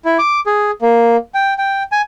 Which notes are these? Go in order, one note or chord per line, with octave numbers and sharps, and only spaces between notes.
E4
D6
G#4
A#3
G5
G5
G#5